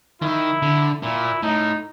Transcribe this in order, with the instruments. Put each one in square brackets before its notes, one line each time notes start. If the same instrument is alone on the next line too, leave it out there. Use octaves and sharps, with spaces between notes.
[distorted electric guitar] D#3 [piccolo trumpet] E4
[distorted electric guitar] D3
[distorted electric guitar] A#2 [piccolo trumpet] E4
[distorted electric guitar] A2 [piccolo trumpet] D#4